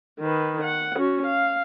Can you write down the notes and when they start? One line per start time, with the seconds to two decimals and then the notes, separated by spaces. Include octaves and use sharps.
0.20 D#3 B4
0.64 F#5
0.97 C#4 F#4
1.26 F5